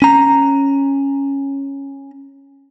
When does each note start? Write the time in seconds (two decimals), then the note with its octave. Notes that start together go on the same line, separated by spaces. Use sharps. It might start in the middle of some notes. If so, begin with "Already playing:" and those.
0.02 C#4 A#5